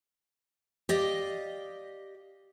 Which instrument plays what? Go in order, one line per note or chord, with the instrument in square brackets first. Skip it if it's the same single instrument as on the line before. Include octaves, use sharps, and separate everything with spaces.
[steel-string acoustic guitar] G4 D5 D#5 F5